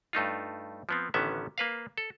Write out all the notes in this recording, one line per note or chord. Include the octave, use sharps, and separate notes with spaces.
G2 A3 D#4 F4
F3 B3 C4
A1 D3 D#3 B3 C#4 E5
A#3 B4 F5
A4